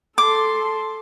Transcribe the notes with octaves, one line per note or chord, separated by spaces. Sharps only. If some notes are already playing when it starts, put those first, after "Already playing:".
A4 C6 D6